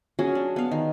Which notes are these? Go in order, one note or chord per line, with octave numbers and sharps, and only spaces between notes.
F#3 C#4 F#4 G#4
D4
B3 F5
D#3